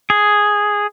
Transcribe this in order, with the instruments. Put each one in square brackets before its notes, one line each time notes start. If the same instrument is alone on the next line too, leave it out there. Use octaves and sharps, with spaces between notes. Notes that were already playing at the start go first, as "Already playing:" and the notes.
[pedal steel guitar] G#4